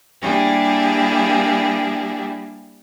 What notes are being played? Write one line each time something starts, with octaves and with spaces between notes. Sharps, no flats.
G3 A#3 D4 E4 G4 G#4